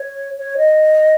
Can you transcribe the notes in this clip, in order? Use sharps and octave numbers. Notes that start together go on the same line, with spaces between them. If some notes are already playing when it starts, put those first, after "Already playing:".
Already playing: C#5
C#5
D#5